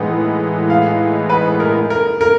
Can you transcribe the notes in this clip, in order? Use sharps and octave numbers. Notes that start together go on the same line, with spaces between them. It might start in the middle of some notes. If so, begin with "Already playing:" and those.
Already playing: A2 E3 G#3 B3 D#4 F#5
F5
B4
A#4
A#4
A#4